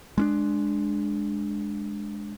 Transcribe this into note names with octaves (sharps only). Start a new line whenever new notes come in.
G#3 C#4 D4